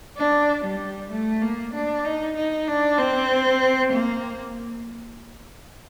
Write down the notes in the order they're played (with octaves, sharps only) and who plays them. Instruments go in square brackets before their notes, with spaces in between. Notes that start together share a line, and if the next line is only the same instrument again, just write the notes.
[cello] D4
G3
A3
A#3
D4
D#4
D#4
D4
C4
A#3